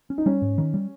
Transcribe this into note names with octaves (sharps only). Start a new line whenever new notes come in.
C#4
D#4
G3 C#4
G#2
D#3
G3